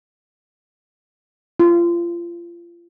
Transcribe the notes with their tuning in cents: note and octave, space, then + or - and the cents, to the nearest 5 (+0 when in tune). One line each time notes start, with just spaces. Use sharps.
F4 -30